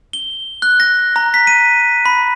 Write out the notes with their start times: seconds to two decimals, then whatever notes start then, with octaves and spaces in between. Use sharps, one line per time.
0.13 G7
0.62 F#6
0.80 A#6
1.16 A#5
1.34 B6
1.47 D#7
2.06 B5